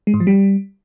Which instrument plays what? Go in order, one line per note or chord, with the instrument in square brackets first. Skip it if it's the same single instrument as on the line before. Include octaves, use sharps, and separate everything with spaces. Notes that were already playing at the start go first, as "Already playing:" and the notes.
[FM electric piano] G#3
G#2
F3
G3